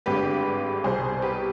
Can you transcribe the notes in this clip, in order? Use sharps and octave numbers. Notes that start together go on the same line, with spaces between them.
G#1 G2 D3 G#3 G4 B4
C2 B2 G3 G#4 C5
G4 B4